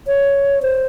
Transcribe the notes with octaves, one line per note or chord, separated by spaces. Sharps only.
C#5
C5